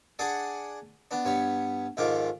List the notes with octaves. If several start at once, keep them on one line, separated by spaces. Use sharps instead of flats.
D4 G#4 D5 F#5 G#5
B3 D4
G2 B3 C#5
F2 G#2 D#3 F4 D6